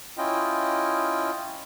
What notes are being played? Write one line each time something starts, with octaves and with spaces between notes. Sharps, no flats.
C#4 E4 F4 D#5 G5